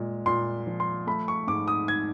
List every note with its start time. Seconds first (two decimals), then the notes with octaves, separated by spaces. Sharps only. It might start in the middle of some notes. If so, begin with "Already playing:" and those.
Already playing: A#2 G#3
0.26 A#2 C6
0.67 F3
0.80 C6
1.07 A3 B5
1.28 C#6
1.47 G#2 D6
1.68 D#6
1.88 G#6